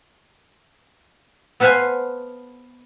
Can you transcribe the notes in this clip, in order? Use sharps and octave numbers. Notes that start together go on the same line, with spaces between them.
B3 A4 B4 C5 F5 G#5